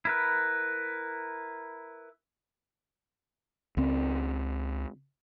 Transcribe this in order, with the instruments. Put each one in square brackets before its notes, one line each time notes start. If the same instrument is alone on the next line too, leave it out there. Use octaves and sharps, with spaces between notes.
[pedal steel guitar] E4 A#4 B4
[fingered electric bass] C#2 C4